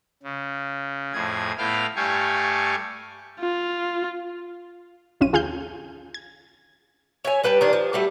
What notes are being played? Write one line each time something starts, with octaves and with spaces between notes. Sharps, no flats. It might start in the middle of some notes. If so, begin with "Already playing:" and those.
C#3
F2 A2 G#4 G#6
A2 B3 E4 F5 G5 F6
G2 A3 G4 F5 G#5 C#6
F4
A1 F#2 C#4 F4 D#7
D#2 F4 G#4 F5 F6 G6
G#6
C#5 E5 G#5
G3 B4 G5 A5
D#3 G3 D4
F3
F#3 G3 A3